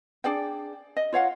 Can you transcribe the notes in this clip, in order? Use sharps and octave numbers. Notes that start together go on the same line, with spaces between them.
D4 G#4 D5 G5
D#5
F4 C#5 F5 F#5